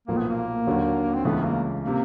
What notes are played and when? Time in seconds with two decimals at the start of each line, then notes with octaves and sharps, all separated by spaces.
0.08 B1 A#2 F3 A3 A#3
0.18 B3
0.29 A#3
0.67 D#2 D3 F#3
1.14 C4
1.24 C#2 C#3 E3 A3 B3
1.45 A#3
1.83 C3 A#3